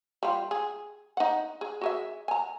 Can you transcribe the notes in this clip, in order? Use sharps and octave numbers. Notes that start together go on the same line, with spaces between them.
G3 F4
G#4
D#4 F#5
G#4
F#4 G#4 E5
G#5 A#5